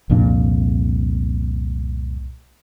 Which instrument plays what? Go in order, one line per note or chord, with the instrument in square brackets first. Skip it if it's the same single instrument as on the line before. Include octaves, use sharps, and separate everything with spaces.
[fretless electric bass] C2 F2 A#2 D4